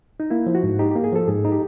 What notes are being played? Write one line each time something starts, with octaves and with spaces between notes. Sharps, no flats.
D#4
A#3 E4
F3
F#4
G#2
D#4 G4
A#3 G4
G#4
F3 A4
G#2 G#4
D#4
G4